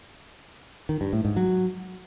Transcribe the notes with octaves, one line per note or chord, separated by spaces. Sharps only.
D#3
G2
A2
G#2
F#3